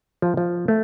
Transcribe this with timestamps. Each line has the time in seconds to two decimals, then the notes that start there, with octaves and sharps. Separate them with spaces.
0.22 F3
0.37 F3
0.68 A3